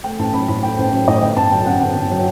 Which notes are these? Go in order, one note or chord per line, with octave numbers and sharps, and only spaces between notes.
A3 G5
A1 A5
F#3 B5
A2 B5
A3 G5
A1 C5
F#3 C5
A2 D#5
G1 G5
G1 A5
F#3 G5
F#2 F#5
G1 G5
G1
F#3